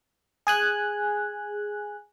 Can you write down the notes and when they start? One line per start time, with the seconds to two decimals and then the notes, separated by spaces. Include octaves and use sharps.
0.47 G#4 G#5 F#6